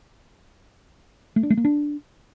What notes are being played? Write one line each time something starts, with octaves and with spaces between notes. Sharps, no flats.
A3
D4
A3
A#3
D4